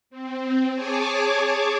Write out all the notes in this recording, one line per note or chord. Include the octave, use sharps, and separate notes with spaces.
C4
G#4 C#5 G#5 A5 D6